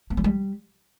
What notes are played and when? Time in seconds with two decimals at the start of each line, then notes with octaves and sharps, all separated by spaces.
0.10 B3
0.17 F#3
0.24 G3